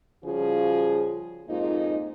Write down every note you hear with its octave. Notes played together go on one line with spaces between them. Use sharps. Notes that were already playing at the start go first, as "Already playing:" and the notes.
C#3 F3 G3 F4 F#4 G#4
F2 G#2 A#3 D#4 F4